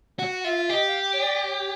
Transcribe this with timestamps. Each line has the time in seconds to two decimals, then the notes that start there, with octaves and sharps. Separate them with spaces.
0.19 F#4 F#5
0.31 F#5
0.44 F4 E5
0.52 F5
0.57 E5
0.69 G4 D#5
0.87 F5
1.13 C#5
1.22 D5
1.47 C#5